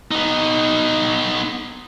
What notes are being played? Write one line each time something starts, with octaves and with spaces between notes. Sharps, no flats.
B3 D#4